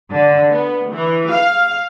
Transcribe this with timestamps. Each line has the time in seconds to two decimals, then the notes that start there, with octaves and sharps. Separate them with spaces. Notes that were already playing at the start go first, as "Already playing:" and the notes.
0.12 D3
0.50 B3
0.91 E3
1.32 F5